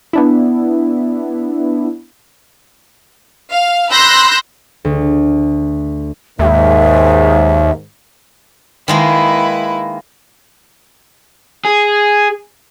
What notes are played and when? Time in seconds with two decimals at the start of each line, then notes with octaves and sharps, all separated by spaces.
0.13 B3 D4 E4
3.51 F5
3.92 B5 C6 E6 F#6 G6 A#6
4.85 D2
6.39 D#2 G#2 D#3 E5
8.88 D#3 G#3 A#3 E4 B4
11.65 G#4